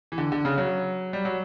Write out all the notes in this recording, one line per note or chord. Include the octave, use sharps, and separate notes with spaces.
E3
D3
D3
C#3
F#3
G3
F#3